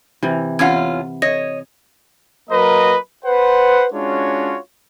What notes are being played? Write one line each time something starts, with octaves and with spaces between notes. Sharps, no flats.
C3 E3
E2 C#4 F4 F#5 G#6
C#5 D#5 A#6
F#3 A#3 A#4 B4 D#5
B4 C5 F#5
G#3 C#4 D4 F4 F#4 C#5